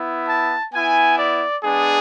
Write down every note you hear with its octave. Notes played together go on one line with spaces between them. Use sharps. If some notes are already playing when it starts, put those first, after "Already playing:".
Already playing: B3 E4
A5
B3 E4 G#5
D5
G#3 B3 D4 G#4